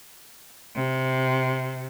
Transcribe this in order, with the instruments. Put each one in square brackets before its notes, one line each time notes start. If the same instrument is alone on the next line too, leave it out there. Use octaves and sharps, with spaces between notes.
[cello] C3